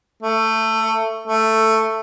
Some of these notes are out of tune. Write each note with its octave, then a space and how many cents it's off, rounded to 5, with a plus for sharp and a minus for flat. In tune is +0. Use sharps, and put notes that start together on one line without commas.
A3 +15
A3 +10